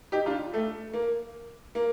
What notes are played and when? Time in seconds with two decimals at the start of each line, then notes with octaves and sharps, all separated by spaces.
0.12 D#4 G4
0.26 D4 F4
0.54 A3
0.93 A#3
1.75 A#3